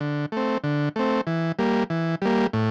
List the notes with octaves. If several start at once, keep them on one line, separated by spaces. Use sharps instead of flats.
D3
A3 C4
D3
A3 C4
E3
G3 A#3
E3
G3 A#3
A2